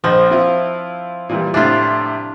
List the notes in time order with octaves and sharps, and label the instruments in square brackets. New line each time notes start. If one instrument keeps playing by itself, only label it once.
[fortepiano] A#1 D#5 [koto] F3
[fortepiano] C4 E4 F4
A#2 E3 G3
[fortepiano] A2 C3 [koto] D4 F4